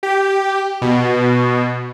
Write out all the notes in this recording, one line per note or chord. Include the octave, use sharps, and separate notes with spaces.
G4
B2